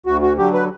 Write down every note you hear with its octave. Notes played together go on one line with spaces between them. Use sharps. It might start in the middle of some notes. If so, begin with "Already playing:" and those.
D2 F#4
F#4
D3 F#3 G4
B4